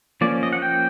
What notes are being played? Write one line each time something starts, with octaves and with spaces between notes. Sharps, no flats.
F3 A#3 C#4 D5
D#5
F#5
G5